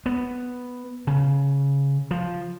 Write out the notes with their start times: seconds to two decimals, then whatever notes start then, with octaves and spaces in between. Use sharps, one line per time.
0.06 B3
1.07 C#3
2.11 F3